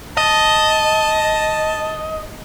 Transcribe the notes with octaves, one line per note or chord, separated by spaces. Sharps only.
D#5 A5